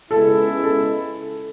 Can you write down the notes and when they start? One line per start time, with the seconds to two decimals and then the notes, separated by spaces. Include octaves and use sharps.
0.11 C#2 C#3 G#3 B3 E4 A4
0.63 A4